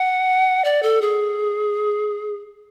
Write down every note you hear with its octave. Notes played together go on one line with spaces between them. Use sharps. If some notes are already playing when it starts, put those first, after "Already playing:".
Already playing: F#5
D5
A4
G#4